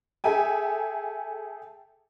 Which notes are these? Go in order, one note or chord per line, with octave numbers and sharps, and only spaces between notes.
G#4 A4 E5 G5 G#5